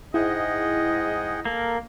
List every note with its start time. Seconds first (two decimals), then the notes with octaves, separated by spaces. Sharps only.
0.14 G#2 E4 G#4 D#5 F#5 G5
1.45 A#3 A4 A#4